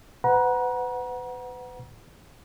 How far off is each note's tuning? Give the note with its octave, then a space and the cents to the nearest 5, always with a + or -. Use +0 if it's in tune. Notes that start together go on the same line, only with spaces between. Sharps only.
B4 +35 F#5 +0 A#5 +40